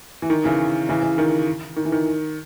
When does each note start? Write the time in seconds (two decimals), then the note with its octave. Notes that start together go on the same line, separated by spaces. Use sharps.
0.22 E3
0.30 D#3
0.44 C#3 E3
0.89 C#3 E3
1.03 C#3
1.18 D#3
1.76 D#3
1.85 E3
1.92 D#3